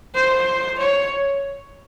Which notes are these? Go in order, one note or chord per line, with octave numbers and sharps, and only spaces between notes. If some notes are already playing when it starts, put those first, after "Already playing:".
C5
C#5